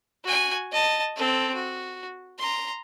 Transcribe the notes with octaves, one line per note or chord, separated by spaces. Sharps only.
F#4 G#5
D#5 A5
C4 A4
F#4
A#5 C6